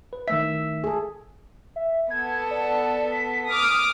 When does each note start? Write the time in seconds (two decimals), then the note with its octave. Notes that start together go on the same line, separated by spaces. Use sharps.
0.13 B4
0.28 D#3 A3 E5 B6
0.84 G#4 A4
1.76 E5
2.10 B3 A4 G#6
2.51 D5
3.12 B6
3.50 D6 D#6 F6